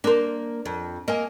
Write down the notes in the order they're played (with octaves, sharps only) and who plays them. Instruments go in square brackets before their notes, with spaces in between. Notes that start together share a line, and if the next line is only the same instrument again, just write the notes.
[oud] A#3 C5 [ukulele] D4 A#4
[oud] F2
[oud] A#3 [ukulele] D#5 G#5